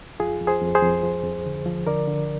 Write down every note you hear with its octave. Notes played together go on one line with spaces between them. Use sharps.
F2 F4 G#4
F2
G#4 C5
F2
G#4 C5
F2
F3
F2
D3
F3
D3 A#4 D5
D3